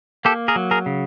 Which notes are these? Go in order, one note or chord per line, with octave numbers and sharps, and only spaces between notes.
A#3 G4 A4
G#4 A#4
F#3
G#4 A#4
C#3